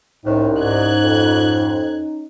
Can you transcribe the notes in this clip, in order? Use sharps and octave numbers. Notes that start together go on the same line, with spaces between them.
C2 A2 C#4 D#4
G#2 F#6 G#6
F2